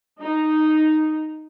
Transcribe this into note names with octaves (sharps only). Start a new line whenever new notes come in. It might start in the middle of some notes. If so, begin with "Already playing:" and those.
D#4